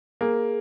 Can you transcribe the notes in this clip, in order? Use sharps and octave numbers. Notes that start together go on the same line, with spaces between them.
A#3 G#4